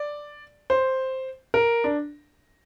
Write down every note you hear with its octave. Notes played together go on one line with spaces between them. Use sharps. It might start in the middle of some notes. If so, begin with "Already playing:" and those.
Already playing: D5
C5
A#4
D4